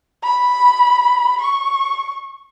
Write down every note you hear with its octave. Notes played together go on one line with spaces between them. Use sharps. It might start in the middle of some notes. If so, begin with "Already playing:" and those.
B5
C#6